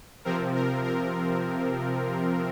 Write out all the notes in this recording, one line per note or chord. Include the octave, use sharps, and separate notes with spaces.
C3 F3 C4 A#4
A#4
A#4